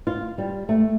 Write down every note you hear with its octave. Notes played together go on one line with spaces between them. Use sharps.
F4
G3
A3